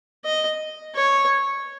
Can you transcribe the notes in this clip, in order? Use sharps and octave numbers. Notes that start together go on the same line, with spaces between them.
D#5
C#5